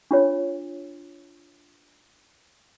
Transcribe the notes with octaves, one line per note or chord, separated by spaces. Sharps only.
D4 F4 C#5